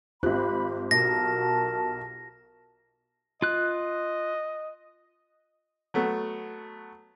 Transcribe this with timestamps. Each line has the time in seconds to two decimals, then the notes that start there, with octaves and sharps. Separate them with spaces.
0.23 G#1 F4 G4 C5 B5 F#6
0.91 B1 F#4 A#4 A5 A#6
3.42 F4 D#5 F#6
5.94 F#3 A3 B3